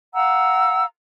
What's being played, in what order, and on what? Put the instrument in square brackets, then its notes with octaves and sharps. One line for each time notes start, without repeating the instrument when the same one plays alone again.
[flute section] F5 F#5 A#5 E6